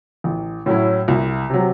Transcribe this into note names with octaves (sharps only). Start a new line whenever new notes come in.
A1
A2 F#3 C#4 E4
C2
C3 F#3